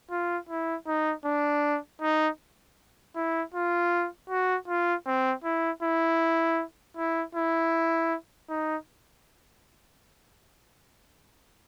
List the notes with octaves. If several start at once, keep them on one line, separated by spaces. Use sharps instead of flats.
F4
E4
D#4
D4
D#4
E4
F4
F#4
F4
C4
E4
E4
E4
E4
D#4